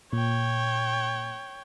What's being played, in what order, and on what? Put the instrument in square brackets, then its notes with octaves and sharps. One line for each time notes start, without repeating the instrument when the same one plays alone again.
[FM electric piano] A#2 [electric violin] C#5 G5